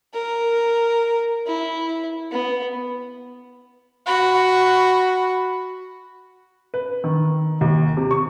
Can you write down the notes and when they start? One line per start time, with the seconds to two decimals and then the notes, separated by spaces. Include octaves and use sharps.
0.14 A#4
1.47 E4
2.32 B3
4.06 F#4 B5
6.74 B4
7.04 D#3
7.61 D#2
7.97 C3
8.11 C#6